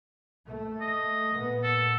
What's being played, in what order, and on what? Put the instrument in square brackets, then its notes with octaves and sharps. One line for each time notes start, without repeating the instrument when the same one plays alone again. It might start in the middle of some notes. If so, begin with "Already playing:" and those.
[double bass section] A3
[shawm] D#5
[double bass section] A#2 B3
[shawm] A4